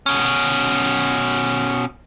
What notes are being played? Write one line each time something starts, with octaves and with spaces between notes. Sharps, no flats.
B2 C#4